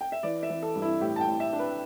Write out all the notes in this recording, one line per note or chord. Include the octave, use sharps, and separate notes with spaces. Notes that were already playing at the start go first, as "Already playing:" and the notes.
G5
E5
E3 D5
E5
E3
A4
G2
E4
A2 G4
A5
G5
A2
E5
D4
B4